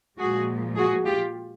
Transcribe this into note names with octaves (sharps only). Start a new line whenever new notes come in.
A#2 F3 G#3 F#4 G#4
F#4 G#4
F4 G4